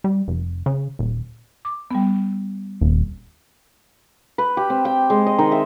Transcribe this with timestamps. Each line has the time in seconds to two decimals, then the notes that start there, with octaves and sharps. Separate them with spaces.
0.04 G3
0.28 F1
0.66 C#3
0.99 D#1
1.65 D6
1.91 G3 B3
2.81 D#1
4.38 B4
4.57 G4
4.70 C4
4.85 G5
5.10 G#3
5.26 D#5
5.38 D#3
5.52 E5